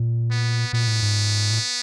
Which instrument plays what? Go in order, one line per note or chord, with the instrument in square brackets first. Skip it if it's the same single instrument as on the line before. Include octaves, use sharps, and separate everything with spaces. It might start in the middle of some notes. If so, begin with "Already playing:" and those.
Already playing: [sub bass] A#2
[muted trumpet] B3
[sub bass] A#2 [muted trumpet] B3
[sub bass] A2
G#2
A2